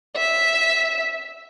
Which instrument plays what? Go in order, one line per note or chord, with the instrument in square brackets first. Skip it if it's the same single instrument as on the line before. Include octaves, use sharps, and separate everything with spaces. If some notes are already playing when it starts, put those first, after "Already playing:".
[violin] E5